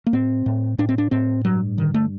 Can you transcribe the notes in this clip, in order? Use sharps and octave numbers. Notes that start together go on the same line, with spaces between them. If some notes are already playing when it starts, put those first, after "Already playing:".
A#3
A2 C4
A2
A2 D4
C4
D4
A2 C4
G2 F#3
D3 D#3
A3